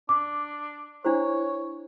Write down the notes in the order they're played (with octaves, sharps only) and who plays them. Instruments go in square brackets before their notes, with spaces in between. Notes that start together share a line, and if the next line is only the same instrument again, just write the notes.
[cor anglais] D4 [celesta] D6
[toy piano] D4 E4 C5 [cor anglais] C#5